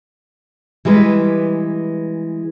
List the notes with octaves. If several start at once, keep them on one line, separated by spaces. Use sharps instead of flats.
E3 G3 G#3 B4